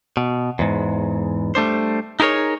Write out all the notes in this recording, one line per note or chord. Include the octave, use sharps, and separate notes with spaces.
B2
E2 G#2
G3 A3 D4 C5
D#4 E4 G#4 A#4 C#5